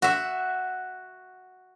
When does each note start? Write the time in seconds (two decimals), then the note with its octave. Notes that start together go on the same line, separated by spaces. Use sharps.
0.02 F#4 E5